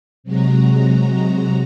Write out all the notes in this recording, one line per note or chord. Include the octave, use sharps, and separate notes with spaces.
C3 F#3 G#3 F#4 A#5